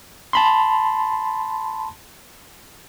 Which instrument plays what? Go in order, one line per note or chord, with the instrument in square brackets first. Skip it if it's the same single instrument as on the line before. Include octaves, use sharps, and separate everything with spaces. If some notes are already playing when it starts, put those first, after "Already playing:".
[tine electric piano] A5 B5 C6